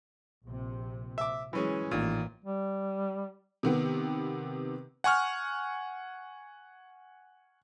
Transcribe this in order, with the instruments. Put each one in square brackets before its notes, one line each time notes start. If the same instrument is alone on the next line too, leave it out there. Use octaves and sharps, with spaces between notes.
[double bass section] A#1 C3
[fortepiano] E5 D6
[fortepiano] E3 C#4 G#4 [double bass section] F#3 G#3
[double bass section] A1 [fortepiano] A#2 D#3
[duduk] G3
[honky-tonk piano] C3 D#3 B3
[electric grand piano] F#5 G#5 C#6 F6